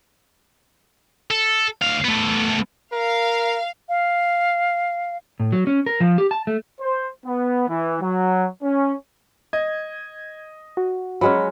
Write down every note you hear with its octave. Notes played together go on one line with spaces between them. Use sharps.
A4
D2 F5
A3 B3
A#4 F5
F5
A2
F#3
C#4
A#4
F3
G4
A5
A3
C5
B3
E3
F#3
C#4
D#5 G#6
F#4
F#3 G#3 C#4 B5